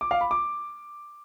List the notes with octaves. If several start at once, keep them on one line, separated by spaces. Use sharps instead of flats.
D6
F5
B5
D6